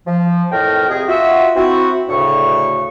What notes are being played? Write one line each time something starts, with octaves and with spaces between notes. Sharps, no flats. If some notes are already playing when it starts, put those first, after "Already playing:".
F3
F2 A2 A#4 G5
F2 C3 G#4
F4 F#4 E5
C4 E4 F#4
D2 A2 C#3 C#6